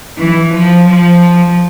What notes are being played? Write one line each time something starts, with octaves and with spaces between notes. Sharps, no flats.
E3
F3
F3